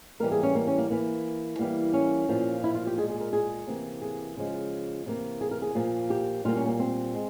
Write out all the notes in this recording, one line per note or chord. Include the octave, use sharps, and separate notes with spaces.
E3 G3 A#3 A#4
G#4
C#4
A#3
C#4
A#3
E3 A#3
E3 G3 A#3
C#4
A#2 F3 A#3
E4
F4
G4
A#2 G#3 G#4
G#4
A#4
G#4
C3 E3 A#3
G#4
C#3 F3 G#3
C3 E3 A#3
G#4
A#4
G#4
A#2 F3 A#3
G4
A#2 G3 A#3 F4
C#4
A#3
C4
G#3